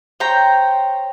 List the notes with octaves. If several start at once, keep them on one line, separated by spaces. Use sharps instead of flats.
C5 C#5 G5 A#5